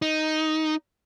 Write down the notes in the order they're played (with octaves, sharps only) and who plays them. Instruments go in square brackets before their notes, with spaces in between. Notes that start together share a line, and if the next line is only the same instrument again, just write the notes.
[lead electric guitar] D#4